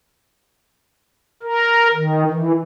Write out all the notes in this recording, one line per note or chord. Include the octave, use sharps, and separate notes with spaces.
A#4
D#3
E3